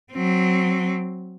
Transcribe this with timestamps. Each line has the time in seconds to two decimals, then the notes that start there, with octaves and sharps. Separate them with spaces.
0.13 F#3 C4